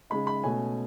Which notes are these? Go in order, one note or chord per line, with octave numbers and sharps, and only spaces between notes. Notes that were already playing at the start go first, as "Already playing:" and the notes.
C#3 G#3 D#4 B5
B5
B2 A3 C#4 G#5